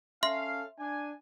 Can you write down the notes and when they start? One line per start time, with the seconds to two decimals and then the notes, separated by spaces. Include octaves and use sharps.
0.23 C#4 A4 E5 F5 C6
0.79 D4 G#5